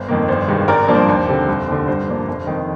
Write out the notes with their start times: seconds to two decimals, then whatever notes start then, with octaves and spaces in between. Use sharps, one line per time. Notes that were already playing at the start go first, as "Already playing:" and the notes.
Already playing: G1 C5
0.08 F2 D#3 A#3
0.28 G1 C5
0.48 G2 D#3 G#3
0.68 G#1 A#4 D5
0.88 G2 F3 A#3 D4
0.95 C5
1.08 D#2
1.28 D3 G3 C4
1.48 F1
1.68 D#2 D3
1.88 G2 C5
2.08 F3 A#3 D4
2.28 F1
2.47 F2 D#3